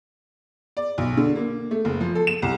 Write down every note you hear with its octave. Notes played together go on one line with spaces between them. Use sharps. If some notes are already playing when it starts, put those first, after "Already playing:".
D5
B1
D3
A#3
A3
F#1
F3
A4
E7
C2